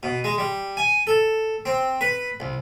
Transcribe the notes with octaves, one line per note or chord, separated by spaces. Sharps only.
B2
G#3
G3
G#5
A4
C4
B4
C2